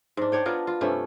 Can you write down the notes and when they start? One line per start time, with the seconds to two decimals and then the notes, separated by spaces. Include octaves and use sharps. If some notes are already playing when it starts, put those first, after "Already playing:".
0.17 G#2 D4
0.32 D4 C#5 G5
0.46 B3 D4 F4 A#4
0.67 F4
0.81 G2 C3 A3 C#4